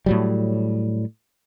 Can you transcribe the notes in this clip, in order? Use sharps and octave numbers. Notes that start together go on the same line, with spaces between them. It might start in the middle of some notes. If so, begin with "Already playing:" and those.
A2 F#3 G3